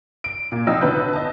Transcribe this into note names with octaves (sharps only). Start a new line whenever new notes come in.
D7
A#2
C2 F3 D#4 G5 E6
B1 D3 B4 G6
D#5 A5